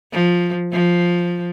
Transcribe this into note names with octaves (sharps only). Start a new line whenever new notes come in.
F3
F3